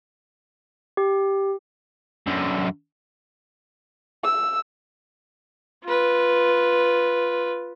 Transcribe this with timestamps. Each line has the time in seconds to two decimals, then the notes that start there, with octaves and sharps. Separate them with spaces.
0.97 G4
2.27 F#2 D3
4.24 E6
5.84 F4 B4